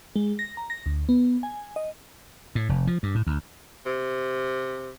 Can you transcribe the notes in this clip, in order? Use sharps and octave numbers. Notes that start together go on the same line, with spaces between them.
G#3
A#6
A#5
A#6
D2
B3
G#5
D#5
A2
F1
F3
G2
A2
D2
C3